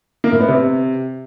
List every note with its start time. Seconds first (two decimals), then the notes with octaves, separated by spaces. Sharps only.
0.24 A#3
0.32 A2
0.40 B3
0.48 C3